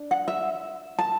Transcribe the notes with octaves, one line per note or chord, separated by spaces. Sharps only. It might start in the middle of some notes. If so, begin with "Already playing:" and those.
Already playing: D4
F#5
E5
A5